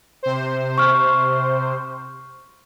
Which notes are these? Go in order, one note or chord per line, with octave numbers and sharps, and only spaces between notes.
C3 C5
C#6 F6